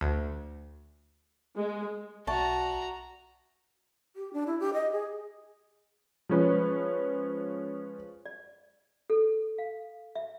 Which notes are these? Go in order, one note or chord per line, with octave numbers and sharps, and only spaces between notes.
D2
G#3
B1 F#4 D5 E5 A5 A#5 C#6
G4
D4
E4
G4
D#5
G#4
F3 G#3 C#4 B4
D5
A4
F5
E5